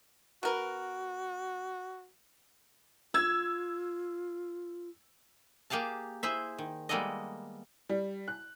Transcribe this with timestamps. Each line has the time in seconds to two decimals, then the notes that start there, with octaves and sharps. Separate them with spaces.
0.43 B2 F#4 A#4 B4
3.14 F4 E6 G#6
5.70 A#3 G4 G#4 F5 A5
6.23 E4 G#4 C5 E5
6.58 D#3
6.89 G3 G#3 A#3 B3 A4 D#5
7.89 G3
8.28 F#6